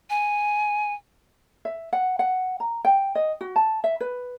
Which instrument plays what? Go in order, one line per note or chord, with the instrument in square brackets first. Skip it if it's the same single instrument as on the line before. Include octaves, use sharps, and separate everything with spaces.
[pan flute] G#5
[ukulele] E5
F#5
F#5
A#5
G5
D#5
F#4
A5
E5
B4